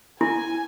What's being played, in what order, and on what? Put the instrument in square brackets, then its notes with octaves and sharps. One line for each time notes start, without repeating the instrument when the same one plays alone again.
[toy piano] E4 [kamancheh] G#5